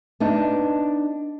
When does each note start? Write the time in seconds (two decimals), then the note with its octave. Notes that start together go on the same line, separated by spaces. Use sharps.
0.20 B3 D4 D#4